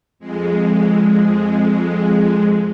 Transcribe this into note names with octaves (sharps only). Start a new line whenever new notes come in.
F2 G#3